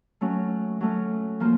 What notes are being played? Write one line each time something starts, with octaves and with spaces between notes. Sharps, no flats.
F#3 A3 C#4
F#3 A3 C#4
F3 A#3 F4